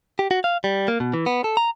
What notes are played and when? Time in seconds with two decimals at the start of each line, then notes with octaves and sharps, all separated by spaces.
0.19 G4
0.31 F#4
0.44 F5
0.64 G3
0.88 A#3
1.00 B2
1.14 E3
1.26 B3
1.44 A4
1.57 A#5